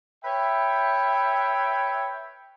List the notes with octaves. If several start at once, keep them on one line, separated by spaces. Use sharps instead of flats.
B4 C#5 E5 G5